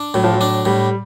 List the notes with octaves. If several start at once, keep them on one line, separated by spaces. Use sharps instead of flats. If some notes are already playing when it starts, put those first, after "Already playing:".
Already playing: D4
A2 F#3
F3
F#3
D4
A2 G3